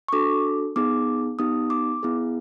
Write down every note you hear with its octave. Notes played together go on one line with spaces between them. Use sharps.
C#6
D4 F#4 A4 D6
B3 D#4 G#4 D6
B3 D#4 G4 D#6
D6
B3 E4 G#4